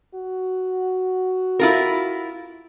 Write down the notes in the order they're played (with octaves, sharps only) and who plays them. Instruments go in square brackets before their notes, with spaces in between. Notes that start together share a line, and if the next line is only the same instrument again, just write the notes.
[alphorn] F#4
[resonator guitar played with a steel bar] E4 F4 A#4